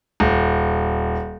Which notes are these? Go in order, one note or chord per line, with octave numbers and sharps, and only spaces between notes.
D#1